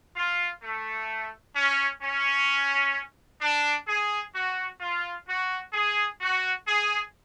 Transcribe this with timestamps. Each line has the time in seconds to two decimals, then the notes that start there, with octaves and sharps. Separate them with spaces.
0.17 F4
0.62 A3
1.56 C#4
2.02 C#4
3.41 D4
3.88 G#4
4.35 F#4
4.81 F4
5.27 F#4
5.73 G#4
6.21 F#4
6.68 G#4